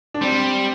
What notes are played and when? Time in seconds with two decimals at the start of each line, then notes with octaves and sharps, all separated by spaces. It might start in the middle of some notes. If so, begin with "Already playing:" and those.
0.14 D4
0.21 G3 C4